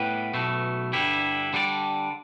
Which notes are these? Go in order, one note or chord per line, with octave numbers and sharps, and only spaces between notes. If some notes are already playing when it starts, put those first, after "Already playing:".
Already playing: A2 G3 B3 G4 B4
B1 B2 A3
G2 D3 G3 E4 G4
D3 G3 D4 B4 D5